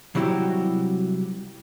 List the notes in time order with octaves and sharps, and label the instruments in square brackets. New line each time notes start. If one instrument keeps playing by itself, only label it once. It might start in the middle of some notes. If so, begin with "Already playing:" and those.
[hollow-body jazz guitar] C3 F#3 G3 E4 F#4 G4